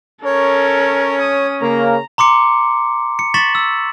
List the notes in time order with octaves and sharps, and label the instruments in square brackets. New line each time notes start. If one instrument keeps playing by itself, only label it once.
[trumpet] C#4 [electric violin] A4 A#4 [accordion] C#5
[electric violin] D#6
[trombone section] C#3 A#3 [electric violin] A#5
[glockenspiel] A#5 C6 D6 C#7
C#7
C#6 A6 B6 E7 F#7
E6